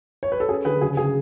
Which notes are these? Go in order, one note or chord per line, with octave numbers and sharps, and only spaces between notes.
C#5
B4
A4
C#4 G#4
D3 G#4 B4
C#3 G#4
C#3 G#4